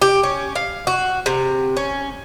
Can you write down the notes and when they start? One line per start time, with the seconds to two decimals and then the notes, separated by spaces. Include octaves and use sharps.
0.02 G4
0.23 C#4
0.55 F5
0.87 F#4
1.26 C3
1.77 C#4